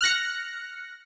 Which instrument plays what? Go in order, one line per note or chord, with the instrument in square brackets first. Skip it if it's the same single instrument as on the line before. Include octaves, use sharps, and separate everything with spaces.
[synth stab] F6 F#6 A#6 C#7